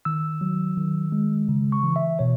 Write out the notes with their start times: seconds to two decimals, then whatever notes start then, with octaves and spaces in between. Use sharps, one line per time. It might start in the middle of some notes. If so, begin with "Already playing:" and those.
0.05 D#3 E6
0.41 F#3
0.77 D#3
1.12 G#3
1.49 C#3
1.72 C#6
1.83 E3
1.96 E5
2.19 B2 C#5